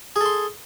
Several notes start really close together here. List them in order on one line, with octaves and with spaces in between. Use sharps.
G#4 A4 C6